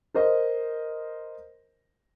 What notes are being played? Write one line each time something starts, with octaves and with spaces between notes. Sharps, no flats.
A#4 C5 D#5